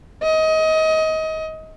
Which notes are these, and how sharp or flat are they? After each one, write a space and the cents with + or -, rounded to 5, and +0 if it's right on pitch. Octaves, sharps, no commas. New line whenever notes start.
D#5 +25